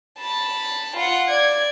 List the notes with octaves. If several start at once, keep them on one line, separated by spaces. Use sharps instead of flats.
A5 B5
F4 F#5
D5 G#6